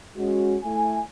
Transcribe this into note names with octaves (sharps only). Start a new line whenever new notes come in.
G#3 C#4 F#4
A3 E4 G#5